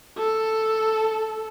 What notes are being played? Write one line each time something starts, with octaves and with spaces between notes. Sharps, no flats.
A4